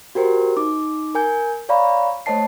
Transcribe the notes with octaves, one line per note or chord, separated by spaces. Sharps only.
F#4 G4 A#4 C5
D#4 D6
A#4 G#5 G6
C#5 D5 F5 A#5 B5 C#6
A3 C5 C#5 D#5 A5 C7